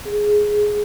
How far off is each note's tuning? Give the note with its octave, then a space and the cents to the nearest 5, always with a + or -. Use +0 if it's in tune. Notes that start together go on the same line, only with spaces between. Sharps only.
G#4 +5